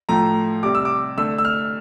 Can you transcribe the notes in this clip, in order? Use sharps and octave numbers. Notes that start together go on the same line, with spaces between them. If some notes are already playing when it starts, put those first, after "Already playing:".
A2 F3 A3 A#5
C3 G3 D6
E6
D6
D3 A3 E6
E6
F6